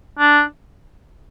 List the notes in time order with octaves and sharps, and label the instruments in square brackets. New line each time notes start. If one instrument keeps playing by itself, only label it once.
[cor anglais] D4